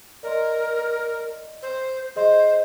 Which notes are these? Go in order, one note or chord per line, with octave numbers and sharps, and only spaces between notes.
A#4 D5 D#5 C6
C5
G#4 C5 D#5 C6